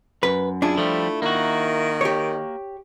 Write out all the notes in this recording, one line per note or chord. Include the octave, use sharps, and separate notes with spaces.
F#2 B4
D4 E4 F4 G#4
F3 G3 A3
D#3 A#3 F#4
G4 C#5